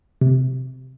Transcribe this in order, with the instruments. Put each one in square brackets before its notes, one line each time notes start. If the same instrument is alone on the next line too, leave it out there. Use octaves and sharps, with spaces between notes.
[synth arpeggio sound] C3